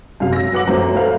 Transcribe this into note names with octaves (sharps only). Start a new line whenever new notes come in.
F#2 C3 F5
E6 A#6
F#3 B4 F#5 D6 F#7
F#2 F3 A3 C#4 C5 A#5
A4 B4 C5 E5 F5